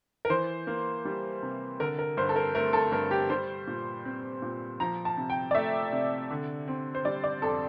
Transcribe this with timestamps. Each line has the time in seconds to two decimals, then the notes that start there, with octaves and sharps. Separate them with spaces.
0.25 A#4
0.30 E3 C5
0.67 A#3
1.05 G3
1.43 C3
1.80 D3 A#4
1.98 A#4
2.17 G2 C5
2.29 A4
2.36 A#4
2.55 A3 A#4
2.73 A4
2.92 G2 A#4
3.11 G4
3.30 G3 C5
3.67 A#2
4.05 C4
4.42 A#2
4.80 F3 A#5
5.05 A5
5.17 C3
5.30 G5
5.51 D5
5.54 A3 E5
5.93 C3
6.31 D3
6.68 C4
6.95 C5
7.05 G3 D5
7.24 D5
7.42 F2 A4